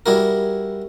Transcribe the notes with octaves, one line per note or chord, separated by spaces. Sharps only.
G3 E4 F#4 A#4